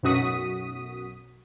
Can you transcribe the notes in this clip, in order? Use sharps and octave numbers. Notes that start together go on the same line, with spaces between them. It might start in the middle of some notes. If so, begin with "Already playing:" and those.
B1 F#2 F#4 D#6 B6